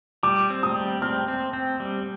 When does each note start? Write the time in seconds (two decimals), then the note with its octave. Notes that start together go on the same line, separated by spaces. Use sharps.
0.23 G3 D6
0.50 C4
0.63 D#6
0.76 G3
1.02 C4 F6
1.28 C4
1.53 C4
1.80 G3